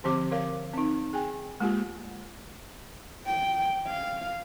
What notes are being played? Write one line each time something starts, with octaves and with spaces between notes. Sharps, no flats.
D3 F3 C4 G4 D6
A#4 C#5 F5
C4 D#4
G#4 G5 G#5
G#3 A#3 F4 G4
G5
F5